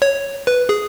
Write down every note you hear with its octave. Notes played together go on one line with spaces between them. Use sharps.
C#5
B4
G#4